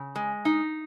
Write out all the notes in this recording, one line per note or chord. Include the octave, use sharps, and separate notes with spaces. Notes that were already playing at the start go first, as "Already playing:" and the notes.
Already playing: C#3
G#3
D#4